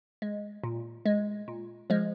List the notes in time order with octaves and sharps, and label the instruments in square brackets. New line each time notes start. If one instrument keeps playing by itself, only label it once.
[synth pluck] G#3
A#2
G#3
A#2
F3 G#3